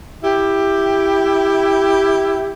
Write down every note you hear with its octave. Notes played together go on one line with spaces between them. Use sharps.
E4 G4